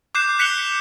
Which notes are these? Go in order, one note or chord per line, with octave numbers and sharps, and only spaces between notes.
D6 F#6 G6 C7 E7
F#6 B6 C#7 E7 F7 G7